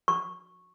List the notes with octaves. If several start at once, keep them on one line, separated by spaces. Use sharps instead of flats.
C#6